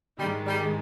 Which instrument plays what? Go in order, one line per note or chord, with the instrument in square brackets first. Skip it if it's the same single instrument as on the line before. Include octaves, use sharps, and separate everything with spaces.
[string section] G#2 D#3 G#3 [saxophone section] G3
[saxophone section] G3